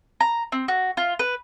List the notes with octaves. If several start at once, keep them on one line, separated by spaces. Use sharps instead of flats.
A#5
C4
F#4
F4
B4